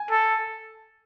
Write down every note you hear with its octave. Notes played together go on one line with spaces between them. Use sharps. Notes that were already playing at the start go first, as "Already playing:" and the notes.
Already playing: G#5
A4